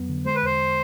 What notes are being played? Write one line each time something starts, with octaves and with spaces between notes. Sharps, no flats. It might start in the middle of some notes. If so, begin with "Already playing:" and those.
Already playing: F2 F#3 B3
D3
G#3 C5
B4
E2 C5